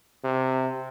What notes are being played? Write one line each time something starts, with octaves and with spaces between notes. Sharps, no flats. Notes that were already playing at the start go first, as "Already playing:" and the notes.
C3